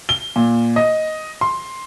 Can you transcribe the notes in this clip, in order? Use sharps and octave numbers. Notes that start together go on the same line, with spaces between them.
G7
A#2
D#5
C6